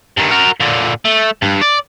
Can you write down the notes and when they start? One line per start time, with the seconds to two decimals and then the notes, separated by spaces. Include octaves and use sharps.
0.17 G2 D#3
0.31 F#4 A#4
0.60 A#2 D3
1.05 A3
1.42 G2
1.61 D5